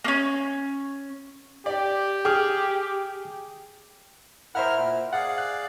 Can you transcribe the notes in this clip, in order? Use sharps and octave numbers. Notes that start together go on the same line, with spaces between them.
A#3 C#4
G4 D5 G5
G#4 G5 D6 F6
E4 A#4 C5 E5 F#5 F6
A#2
G#4 D5 F5 F#5
F#6